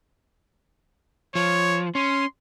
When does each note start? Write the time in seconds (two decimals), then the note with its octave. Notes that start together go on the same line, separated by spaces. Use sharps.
1.35 F3 C#5
1.95 C#4 C6